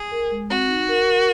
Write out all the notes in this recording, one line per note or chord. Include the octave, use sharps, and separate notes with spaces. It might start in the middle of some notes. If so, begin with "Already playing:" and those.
Already playing: G#4
A#4
G#3
C4 F#4
D#4
A#4
A#4